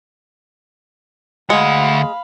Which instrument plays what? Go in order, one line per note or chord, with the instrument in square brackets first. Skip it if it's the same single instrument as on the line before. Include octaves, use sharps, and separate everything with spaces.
[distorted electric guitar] D2 F#5 [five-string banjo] G#3 [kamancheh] F5 B5